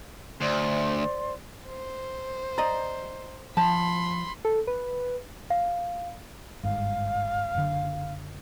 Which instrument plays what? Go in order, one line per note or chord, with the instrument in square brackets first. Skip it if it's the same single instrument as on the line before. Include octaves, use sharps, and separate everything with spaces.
[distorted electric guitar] D2 [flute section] C5 D5 C6
[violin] C5
[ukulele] D5 D#5 [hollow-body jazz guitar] A#5
[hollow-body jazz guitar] F3 [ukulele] A5 [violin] B5 C6
[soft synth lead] A4
B4
[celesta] F5
[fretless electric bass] G1 G#2 [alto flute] F5
[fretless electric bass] F#1 D3